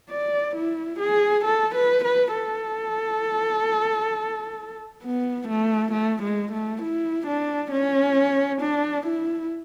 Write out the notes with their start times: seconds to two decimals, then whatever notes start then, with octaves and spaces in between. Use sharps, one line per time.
0.10 D5
0.56 E4
0.99 G#4
1.44 A4
1.75 B4
2.04 B4
2.34 A4
5.03 B3
5.48 A3
5.92 A3
6.22 G#3
6.52 A3
6.82 E4
7.27 D4
7.71 C#4
8.61 D4
9.07 E4